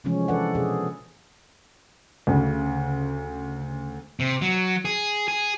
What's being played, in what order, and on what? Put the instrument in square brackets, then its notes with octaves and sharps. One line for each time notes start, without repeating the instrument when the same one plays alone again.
[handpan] C3 E3 F3 G#3 A3 C#4
E3 D4 A4 B4 D5 F#5
B2 G#4
[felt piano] D2 [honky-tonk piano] C#3
[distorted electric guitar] C3
F#3
G#4
G#4